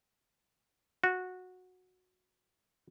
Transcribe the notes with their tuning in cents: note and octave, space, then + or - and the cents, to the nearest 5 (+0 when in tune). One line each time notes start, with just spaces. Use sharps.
F#4 -15